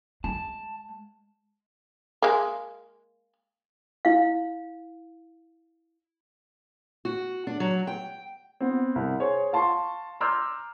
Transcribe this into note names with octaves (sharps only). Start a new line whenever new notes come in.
G#3 A5
G#3 A#3
E4 F5
F#4
D4
F#3
G5
B3 C4
C2
G#4 C5 C#5
F5 A5 C6 C#6
A#5 C6 D6 E6 F6 G6